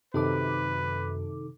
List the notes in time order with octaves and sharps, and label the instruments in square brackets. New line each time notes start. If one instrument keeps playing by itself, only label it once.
[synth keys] F#2 [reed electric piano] C3 D#3 [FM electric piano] D#4 A4 D6 [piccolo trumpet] B4